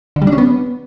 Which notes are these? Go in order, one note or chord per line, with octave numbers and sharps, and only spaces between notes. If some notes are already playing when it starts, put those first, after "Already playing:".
D3
G3
D4
C#4
B3